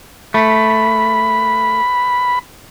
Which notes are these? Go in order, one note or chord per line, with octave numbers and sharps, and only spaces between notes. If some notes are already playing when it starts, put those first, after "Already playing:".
A3 B5